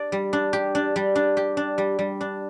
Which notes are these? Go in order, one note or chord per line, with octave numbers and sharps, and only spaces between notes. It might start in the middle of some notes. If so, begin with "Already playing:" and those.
Already playing: D4 G4 D5
G3
D4
G4
D4
G3
D4
G4
D4
G3
G3
D4